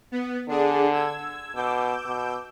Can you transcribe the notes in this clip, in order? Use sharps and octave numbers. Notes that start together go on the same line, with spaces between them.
B3
D3 D4 G#4
E6 G#6
B2 D6 E6 G6
B2